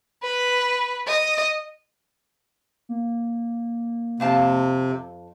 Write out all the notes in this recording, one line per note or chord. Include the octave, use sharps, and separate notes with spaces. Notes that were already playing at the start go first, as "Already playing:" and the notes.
B4
D#5
A#3
F2 C3 F5 A5